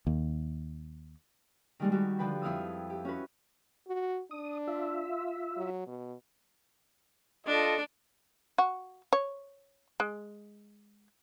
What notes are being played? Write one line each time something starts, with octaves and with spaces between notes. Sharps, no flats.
D#2
D#3 G3 G#3
G3 F#4 G4
D3 F3 B4 G5 B5
F2 E4 F5 D#6 E6
G4
C#4 F#4 B4
F#4
D4 D#6
F4 E5
F#3
B2
D4 F4 A4 D#5
F#4
C#5
G#3